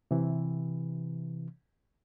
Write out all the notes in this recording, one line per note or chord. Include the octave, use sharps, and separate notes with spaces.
C3 E3